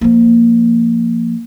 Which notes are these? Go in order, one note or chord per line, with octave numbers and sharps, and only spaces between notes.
F3 A#3